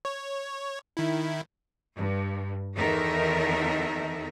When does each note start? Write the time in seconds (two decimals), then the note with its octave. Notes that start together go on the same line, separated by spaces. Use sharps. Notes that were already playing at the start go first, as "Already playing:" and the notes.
0.05 C#5
0.97 D#3 E4
1.96 G2
2.76 E2 D#3 D#4 A4 A#4 E5